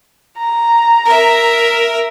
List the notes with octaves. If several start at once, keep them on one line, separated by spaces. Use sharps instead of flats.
A#5
A#4 E5